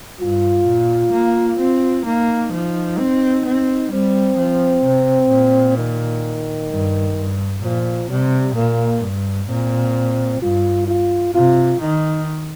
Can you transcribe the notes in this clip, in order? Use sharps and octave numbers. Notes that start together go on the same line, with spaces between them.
G2 F4
A#2
A#3
C4
A#3 D#4
F3
C4
C4
G3 C4
F3
C3
A#2
D#3
G2
G2
A#2 F3
C3 G3
A#2 A#3
G2
A#2 C4
G2 F4
F4
C3 F4
D#3 D#4